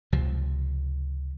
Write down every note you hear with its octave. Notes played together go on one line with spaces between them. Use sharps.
C#2 C3 F3